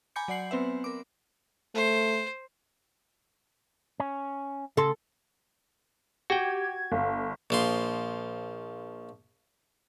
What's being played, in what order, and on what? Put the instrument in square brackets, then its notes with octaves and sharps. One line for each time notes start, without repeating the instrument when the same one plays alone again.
[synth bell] G#5 A#5 B5 D6 G6 C#7
F#3 D5 F#5 C7 F#7
B3 C4 B4 E5
A#4 D6
[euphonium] A3 [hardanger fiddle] C5
[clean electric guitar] C#4
[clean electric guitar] C#3 C6 [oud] A4
[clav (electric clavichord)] F#4 G5 [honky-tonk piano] G4 [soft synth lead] G#6
[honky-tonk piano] G1 [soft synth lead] F5
[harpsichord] A#1 F3 C6